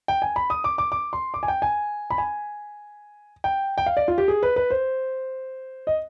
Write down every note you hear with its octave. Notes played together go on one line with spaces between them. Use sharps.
G5
G#5
B5
D#6
D6
D6
D6
C6
D6
G#5
G5
G#5
B5
G#5
G5
G5
F5
D5
F4
G4
G#4
B4
B4
C5
D#5